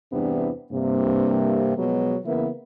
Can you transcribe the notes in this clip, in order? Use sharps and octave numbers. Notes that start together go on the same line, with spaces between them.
E2 G2 C3 E3 B3 D4
G2 C3 A#3
B2 F3 F#3 G#3 B3
C#3 E3 A#3 B3 E4